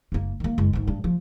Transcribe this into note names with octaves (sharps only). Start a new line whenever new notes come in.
F#1 A#3
D#3 A#3
F#1 G#3
G#1 D2
G2
F3